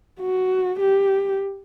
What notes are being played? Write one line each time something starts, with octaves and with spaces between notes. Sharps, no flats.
F#4
G4